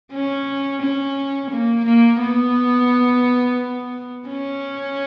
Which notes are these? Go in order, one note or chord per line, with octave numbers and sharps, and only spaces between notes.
C#4
C#4
A#3
A#3
B3
C#4